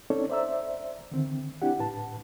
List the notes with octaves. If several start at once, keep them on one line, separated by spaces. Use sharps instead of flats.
C4 C#4 D#4 A4 C#5 D5
C5 D5 E5 A#5 E6
D3 D#3 C4
C4 D4 E4 G4 F#5
A2 B4 A5